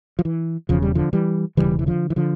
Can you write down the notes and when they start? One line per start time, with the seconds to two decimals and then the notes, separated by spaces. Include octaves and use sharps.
0.19 F3
0.25 E3
0.69 E1 E2 C#3 F3
0.82 G3
0.95 D3 F3
1.13 E3 G3
1.57 E1 E2 C#3 E3 G3
1.79 E3
1.87 D3 F3
2.10 E3
2.16 D3 F3